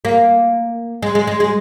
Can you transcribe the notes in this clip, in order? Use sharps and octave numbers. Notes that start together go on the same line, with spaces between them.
A#3
G#3
G#3
G#3
G#3